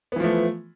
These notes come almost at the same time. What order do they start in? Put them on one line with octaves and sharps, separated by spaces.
B3 E3 F3 A3